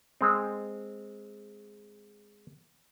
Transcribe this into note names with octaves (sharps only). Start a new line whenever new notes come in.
G#3 C4